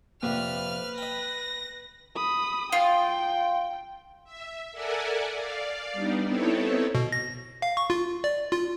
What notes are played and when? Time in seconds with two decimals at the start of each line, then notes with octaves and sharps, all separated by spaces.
0.23 A#1 F2 C3 A#3 B4 F6
0.98 D#5 G5 A#6
2.15 B5 D#6
2.72 F4 G5
4.24 E5
4.72 A4 A#4 D5 E5 F#5 G#5
5.32 D5 F5
5.93 G3 B3 D4 D#4
6.25 B3 C4 D#4 E4 A4 C#5
6.95 B2
7.12 A#6
7.62 F5
7.77 C#6
7.90 F4
8.24 D5
8.52 F4